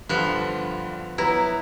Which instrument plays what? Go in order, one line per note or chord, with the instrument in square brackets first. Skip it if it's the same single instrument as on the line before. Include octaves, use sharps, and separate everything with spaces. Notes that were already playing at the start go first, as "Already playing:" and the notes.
[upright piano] G2 D3 F#6 [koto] F3 B3
[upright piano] F#3 B3 A#5 [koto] E4